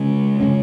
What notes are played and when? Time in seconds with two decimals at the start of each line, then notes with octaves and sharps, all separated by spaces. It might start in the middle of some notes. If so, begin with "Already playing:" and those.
Already playing: C#3 G#3 C#4
0.40 C#3 G#3 C#4